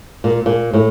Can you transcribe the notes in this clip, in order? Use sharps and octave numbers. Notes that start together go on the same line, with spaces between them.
A#2
A#2
A2